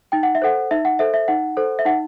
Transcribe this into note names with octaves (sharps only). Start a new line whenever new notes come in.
D#4 G5
F#5
E5
A4 C5 F#5
D#4 E5
F#5
A4 C5 E5
E5
D#4 F#5
A4 C5
E5
D#4 F#5